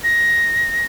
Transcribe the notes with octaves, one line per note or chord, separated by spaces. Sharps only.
A#6